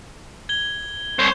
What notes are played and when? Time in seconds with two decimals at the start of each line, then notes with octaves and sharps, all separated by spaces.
0.49 G#6 G7
1.19 C2 C5 C#5 G6